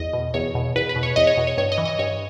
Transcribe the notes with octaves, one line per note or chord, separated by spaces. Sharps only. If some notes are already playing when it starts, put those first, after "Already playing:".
Already playing: E2 D#5
B2
E2 C#5
B2
E2 B4
B4
B2
C#5
E2 D#5
C#5
B2
C#5
G2 C#5
D#5
E3
D#5
G2 C#5